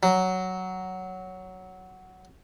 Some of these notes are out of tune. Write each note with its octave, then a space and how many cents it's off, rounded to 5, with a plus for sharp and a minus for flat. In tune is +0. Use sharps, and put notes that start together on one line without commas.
F#3 +5